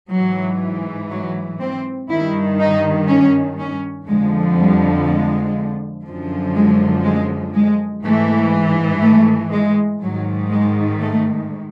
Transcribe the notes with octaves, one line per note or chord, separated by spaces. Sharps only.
G#2 E3 F#3
F#3
C4
G2 D#3 E4
D#4
C#4
C#4
F2 D3 F3 G#3
G3
G#3
F#2 D3 F3
G#3
G#3
G#3
G#2 E3 A3
A3
G#3
G#2 D#3 F#3
G#3
A3